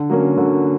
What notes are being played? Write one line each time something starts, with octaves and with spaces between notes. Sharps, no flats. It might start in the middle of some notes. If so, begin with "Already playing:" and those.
Already playing: D3
F#3 A#3 C#4
D3